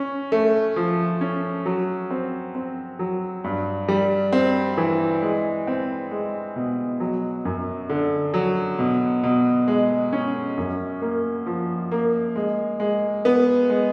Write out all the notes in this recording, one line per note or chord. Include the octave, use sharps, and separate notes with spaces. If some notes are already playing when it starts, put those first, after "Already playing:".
Already playing: C#4
A3
F3
C#4
F#3
C4
C4
F#3
G2
G3
C4
E3
G#3
C4
G#3
B2
F#3
F#2
D3
F#3
B2
B2
G#3
C#4
F#2
A#3
F3
A#3
G#3
G#3
B3
G#3